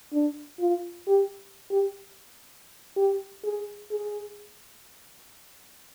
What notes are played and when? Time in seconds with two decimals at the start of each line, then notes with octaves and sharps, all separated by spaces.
0.13 D4
0.60 F4
1.08 G4
1.71 G4
2.96 G4
3.45 G#4
3.91 G#4